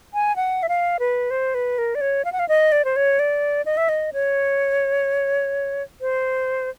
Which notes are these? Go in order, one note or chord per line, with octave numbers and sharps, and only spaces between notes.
G#5
F#5
E5
F5
B4
C5
B4
A#4
D5
C#5
F5
F#5
F5
D#5
D5
C5
C#5
D5
D#5
E5
D#5
C#5
C5